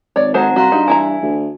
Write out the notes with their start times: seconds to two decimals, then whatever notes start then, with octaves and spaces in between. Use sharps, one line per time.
0.16 G#1 C#5 D5
0.34 G#3 F#4 A4 C5 F#5 A#5
0.56 C2 F#4 F5 A#5 C6
0.72 G2 D#4
0.88 E3 E4 G#5 A#5
1.22 D2